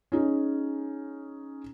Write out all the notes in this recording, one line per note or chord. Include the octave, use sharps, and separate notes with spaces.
C#4 D#4 G#4